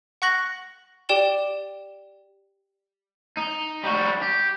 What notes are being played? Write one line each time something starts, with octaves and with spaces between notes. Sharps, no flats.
F#5 C#6 F#6 A#6 F#7
G4 D5 G5 E7 G7
D#4
G3 F#4
G4